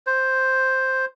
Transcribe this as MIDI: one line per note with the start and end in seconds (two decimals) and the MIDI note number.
0.07 1.05 72